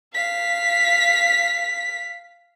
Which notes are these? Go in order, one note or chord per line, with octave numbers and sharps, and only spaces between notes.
F5 B6